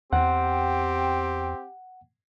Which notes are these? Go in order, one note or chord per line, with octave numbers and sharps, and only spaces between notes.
E2 C4 G4 F#5